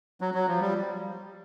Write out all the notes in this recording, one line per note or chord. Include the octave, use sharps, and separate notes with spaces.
F#3
F#3
F3
G3